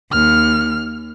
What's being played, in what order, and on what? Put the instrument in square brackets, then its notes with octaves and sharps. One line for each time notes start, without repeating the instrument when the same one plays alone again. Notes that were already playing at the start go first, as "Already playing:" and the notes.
[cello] D#2 [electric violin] F6